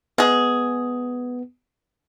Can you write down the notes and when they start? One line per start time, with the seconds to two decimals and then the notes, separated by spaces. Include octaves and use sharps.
0.18 G#3 B3 G#4